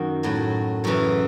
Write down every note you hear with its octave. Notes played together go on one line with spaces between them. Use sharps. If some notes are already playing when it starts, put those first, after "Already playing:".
Already playing: F#2 D#3 F#4
A2 F#3
F#2 C#3 E3 C#5